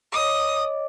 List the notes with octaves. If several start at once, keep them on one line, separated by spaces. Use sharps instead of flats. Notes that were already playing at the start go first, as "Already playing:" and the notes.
C#5 D#5 D6 D#6